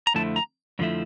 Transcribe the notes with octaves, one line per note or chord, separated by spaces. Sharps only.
A#5
F2 D3 F3 A3 E4 A5
A#5
F2 D3 F3 A3 E4